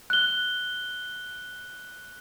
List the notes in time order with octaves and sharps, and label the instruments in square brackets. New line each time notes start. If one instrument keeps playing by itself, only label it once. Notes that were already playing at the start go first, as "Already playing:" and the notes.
[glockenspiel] F#6 G7